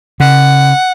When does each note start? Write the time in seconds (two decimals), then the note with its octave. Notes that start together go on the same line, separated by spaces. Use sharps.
0.20 C#3 F#5